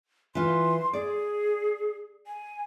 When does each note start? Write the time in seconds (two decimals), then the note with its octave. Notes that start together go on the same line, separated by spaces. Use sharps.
0.35 E3 F4 C6
0.93 G#4 D5
2.27 G#5